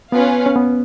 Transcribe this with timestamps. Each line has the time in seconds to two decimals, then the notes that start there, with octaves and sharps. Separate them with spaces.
0.12 B3 C#4 F4 B4 F5
0.46 C#4
0.56 B3